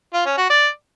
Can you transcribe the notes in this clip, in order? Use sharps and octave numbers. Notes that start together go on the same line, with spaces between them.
F4
C#4
F#4
D5